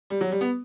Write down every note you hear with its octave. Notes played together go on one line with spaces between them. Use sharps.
G3
F#3
G3
B3